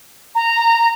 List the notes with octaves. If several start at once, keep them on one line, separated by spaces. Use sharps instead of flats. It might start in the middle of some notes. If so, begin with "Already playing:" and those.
A#5